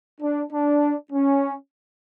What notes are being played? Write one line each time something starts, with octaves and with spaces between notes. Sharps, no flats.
D4
D4
C#4